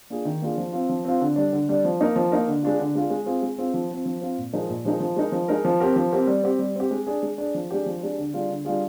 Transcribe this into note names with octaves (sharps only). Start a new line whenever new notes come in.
A#3 D4 F4 G#4
D#3
A#3 D4 F4 G#4
F3
C4 F4
F3
C4 F4
D3
G3 D4
D3
G3 D4
F3
A#3 D#4 A#4
F3
A#3 D#4 A#4
D3
G#3 D4 F4
D3
G#3 D4 F4
G#3
C4 F4 G#4
G#3
C4 F4 G#4
F3
C4 F4
F3
C4 F4
A#2
F3 G#3 D#4 A#4
A#2
F3 G#3 D#4 A#4
F3
G#3 D#4 A#4
F3
G#3 D#4 A#4
F3
C4 G4 A#4
F3
C4 G4 A#4
G3
C4 G4
G3
C4 G4
G#3
D4 G#4
G#3
D4 G#4
F3
G#3 D4 G4
F3
G#3 D4 G4
D3
G3 D4 F4 G#4
D3
G3 D4 F4 G#4